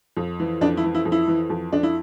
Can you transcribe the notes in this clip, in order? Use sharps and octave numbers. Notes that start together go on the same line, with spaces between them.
F2
E3
F2 D4
E4
E3
E4
F2
E4
E3
F2
F2 D4
E4